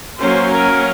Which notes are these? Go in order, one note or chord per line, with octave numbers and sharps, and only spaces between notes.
F#3 A#3 C#4 C5
A#4